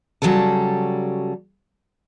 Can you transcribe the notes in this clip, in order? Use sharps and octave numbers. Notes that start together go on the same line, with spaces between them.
C#3 F#3 G3 A4 A5